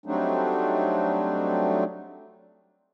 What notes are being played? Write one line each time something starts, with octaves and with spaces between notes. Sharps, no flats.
F#3 G3 A3 C4 D4 D#4